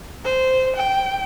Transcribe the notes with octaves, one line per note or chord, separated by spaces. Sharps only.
C5
G5